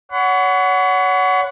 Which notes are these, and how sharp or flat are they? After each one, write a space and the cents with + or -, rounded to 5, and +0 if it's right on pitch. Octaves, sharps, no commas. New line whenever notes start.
C#5 +30 F#5 +0 B5 +40